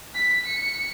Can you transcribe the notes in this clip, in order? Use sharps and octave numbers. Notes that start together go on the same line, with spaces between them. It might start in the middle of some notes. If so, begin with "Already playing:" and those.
B6
C#7